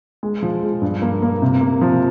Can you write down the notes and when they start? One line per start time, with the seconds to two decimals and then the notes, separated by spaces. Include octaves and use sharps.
0.23 G#3
0.43 F3
0.63 G#3
0.82 G2
1.02 A#3
1.22 A#3
1.42 C3
1.61 A#3
1.81 F3